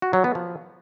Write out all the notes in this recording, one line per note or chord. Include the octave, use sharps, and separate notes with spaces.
F#4
F#3
B3
F3